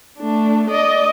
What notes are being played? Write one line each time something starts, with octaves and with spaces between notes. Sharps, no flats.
A3 D4
D5 D#5